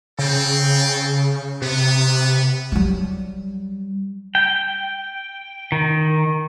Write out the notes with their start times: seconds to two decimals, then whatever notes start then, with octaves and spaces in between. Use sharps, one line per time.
0.19 C#3 C4 A4 G5
1.62 C3 B3
2.72 F#3 G3
4.35 G5
5.72 D#3